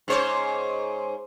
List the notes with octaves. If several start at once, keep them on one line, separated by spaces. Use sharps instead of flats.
G#2 C5 C#5